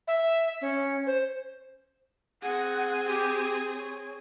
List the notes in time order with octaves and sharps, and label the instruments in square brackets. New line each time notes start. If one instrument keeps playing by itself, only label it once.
[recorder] E5
C#4
C5
[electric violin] C4 G#4 [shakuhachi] F#5
[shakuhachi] G4
C#5